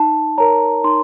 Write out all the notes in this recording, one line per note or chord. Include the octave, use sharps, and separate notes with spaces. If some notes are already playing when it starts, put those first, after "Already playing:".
Already playing: D#4 A5
A#4 C#5 A#5
D#4 C6